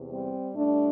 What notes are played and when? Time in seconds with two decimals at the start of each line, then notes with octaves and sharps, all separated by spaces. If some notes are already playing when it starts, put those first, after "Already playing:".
Already playing: E2 C3
0.09 G3 C4
0.55 A2 G3 A3 D4